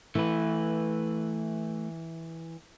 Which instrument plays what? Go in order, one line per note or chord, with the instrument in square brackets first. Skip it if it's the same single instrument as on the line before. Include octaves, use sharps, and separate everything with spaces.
[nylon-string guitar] E3 [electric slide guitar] A3 B4